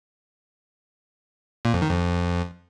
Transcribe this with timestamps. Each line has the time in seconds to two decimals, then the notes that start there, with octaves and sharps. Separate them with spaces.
1.65 A#2
1.73 F2
1.82 D#3
1.90 F2